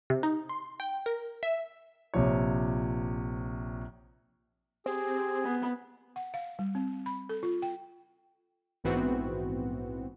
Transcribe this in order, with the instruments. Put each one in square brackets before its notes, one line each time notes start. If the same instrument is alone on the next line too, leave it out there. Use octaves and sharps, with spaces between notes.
[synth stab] C3
D#4
C6
G5
A#4
E5
[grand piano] A#1 C3 F3 C#5
[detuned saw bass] C4 [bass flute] G4 [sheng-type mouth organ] G#4
[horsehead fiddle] B3
[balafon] F#5
F5
G3
C4
B5
A4
F4
G5
[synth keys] A#1 G#2 E3 B3 C4 F#4